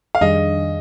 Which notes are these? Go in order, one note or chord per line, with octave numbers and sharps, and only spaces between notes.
F5
F2 D#3 G3 D4 G#4 D#5